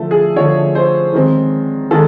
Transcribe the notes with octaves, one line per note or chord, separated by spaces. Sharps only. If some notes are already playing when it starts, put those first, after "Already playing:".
Already playing: D3 F3 A3 A4
G#4
D3 F3 A3 C#5
C5
D#3 G#3 C4
D#3 G#3 A4